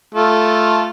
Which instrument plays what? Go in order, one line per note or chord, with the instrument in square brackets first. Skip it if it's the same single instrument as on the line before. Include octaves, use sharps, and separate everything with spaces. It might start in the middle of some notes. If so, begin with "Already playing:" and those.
[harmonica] A3 F4 A4